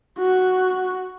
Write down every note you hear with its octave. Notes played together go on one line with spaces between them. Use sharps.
F#4